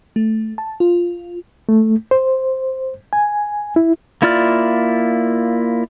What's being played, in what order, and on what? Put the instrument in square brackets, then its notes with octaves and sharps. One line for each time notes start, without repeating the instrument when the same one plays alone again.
[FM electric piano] A3
A5
F4
[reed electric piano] A3
C5
G#5
E4
[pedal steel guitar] A#3 E4 F4 D5 F6